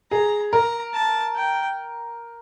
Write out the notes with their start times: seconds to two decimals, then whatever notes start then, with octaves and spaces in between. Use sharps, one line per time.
0.11 G#4 A#5
0.52 A#4 A#5
0.93 A5
1.35 G5